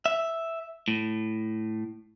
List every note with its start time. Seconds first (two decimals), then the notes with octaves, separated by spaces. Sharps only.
0.06 E5
0.88 A2